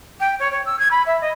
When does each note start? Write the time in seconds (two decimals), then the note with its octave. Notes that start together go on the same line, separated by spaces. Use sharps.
0.19 G5
0.39 C#5
0.51 C#5
0.65 E6
0.79 G#6
0.90 B5
1.06 E5
1.20 D#5